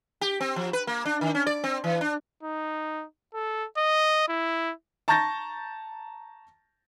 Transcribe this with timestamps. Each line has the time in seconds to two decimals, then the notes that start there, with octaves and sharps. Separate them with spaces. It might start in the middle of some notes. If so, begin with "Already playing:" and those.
0.21 G4
0.41 C4
0.56 F3
0.73 B4
0.87 A#3
1.06 D4
1.21 D#3
1.35 C#4
1.47 D5
1.64 C4
1.84 E3
2.01 D4
2.43 D#4
3.34 A4
3.77 D#5
4.29 E4
5.08 A5 A#5 C#6 G6 A6 A#6